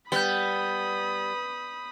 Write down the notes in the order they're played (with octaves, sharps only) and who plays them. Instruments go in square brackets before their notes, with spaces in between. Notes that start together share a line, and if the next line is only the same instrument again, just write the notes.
[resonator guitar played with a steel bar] G3 [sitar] B3 [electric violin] B5 D#6 [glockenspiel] G6 G7